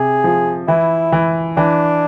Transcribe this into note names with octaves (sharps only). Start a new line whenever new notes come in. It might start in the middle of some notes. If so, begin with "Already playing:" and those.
Already playing: C3 G#4
F3
E3 E4
E3
E3 D4